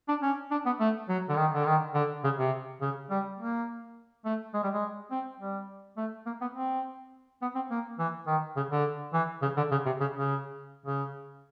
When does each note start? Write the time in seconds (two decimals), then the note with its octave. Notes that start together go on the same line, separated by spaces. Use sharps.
0.08 D4
0.22 C#4
0.51 D4
0.66 B3
0.80 A3
1.09 F#3
1.29 D3
1.37 D#3
1.54 D3
1.67 D#3
1.94 D3
2.24 C#3
2.38 C3
2.81 C#3
3.10 G3
3.38 A#3
4.25 A3
4.54 G#3
4.63 G3
4.73 G#3
5.11 C4
5.40 G3
5.97 A3
6.26 A#3
6.41 B3
6.54 C4
7.42 B3
7.55 C4
7.71 A#3
7.99 E3
8.27 D#3
8.57 C#3
8.71 D3
9.13 E3
9.42 C#3
9.57 D3
9.71 C#3
9.86 C3
10.00 C#3
10.15 C#3
10.86 C#3